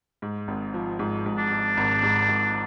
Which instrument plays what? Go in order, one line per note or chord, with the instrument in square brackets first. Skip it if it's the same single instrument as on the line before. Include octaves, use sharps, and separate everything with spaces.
[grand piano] G#2
G#1
F3
G#2
G#2
[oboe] D4
[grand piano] G#2
G#1
G#2
G#1